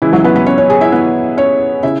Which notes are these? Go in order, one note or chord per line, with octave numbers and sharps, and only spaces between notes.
C#3 E3 G#3 E4
F#3 F#4
B3 B4
B3 B4
C#4 C#5
C#4 C#5
G#4 G#5
E4 E5
B3 B4
C#4 C#5
C#3 E4 E5